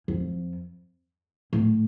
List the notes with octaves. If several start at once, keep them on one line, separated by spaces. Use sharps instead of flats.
F2
A2